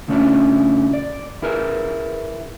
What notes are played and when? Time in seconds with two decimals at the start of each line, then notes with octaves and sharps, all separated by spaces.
0.08 C#3 A3 C#4 D4 E4
0.93 D5
1.42 E4 G#4 A#4 B4